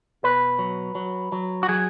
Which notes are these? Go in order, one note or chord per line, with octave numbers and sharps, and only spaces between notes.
B2 B4
F#3
F#3
F#3
F#4
F#3 G#4